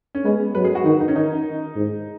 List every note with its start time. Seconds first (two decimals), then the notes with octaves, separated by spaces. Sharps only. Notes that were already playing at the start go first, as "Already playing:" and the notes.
0.15 C#4
0.25 G#3 B3
0.55 F#3 B4
0.64 G#4
0.75 F#4
0.85 D#3 D#4
1.00 D#4
1.08 C#4
1.16 D#3 D#4
1.76 G#2